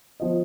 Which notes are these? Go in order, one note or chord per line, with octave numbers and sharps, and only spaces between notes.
F3 B3 D#5